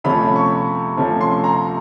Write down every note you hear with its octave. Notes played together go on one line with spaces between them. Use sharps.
C3 F3 A3 C#4 B5
C#6
C3 F3 A3 C#4
C6
A#5